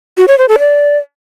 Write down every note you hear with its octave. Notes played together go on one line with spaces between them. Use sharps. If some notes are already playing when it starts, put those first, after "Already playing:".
F#4
C#5
C5
A4
D5